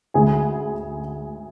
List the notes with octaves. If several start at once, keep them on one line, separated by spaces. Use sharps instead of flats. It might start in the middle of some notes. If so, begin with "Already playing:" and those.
D2 D3 G#3 G#4 G#5